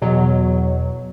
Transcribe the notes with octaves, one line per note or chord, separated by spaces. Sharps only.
E2 B2 F#3